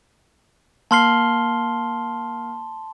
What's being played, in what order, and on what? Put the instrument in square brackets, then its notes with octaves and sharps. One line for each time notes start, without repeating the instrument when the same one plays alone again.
[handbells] A#3 F6 C7 [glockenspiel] A5 C6 G7